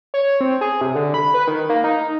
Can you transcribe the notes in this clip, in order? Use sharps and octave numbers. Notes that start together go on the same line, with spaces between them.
C#5
C4
G#4
C3
D3
B5
B4
D#3
A#3
D#4